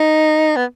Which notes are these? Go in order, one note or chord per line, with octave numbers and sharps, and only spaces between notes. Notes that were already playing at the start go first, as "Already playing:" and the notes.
Already playing: D#4
B3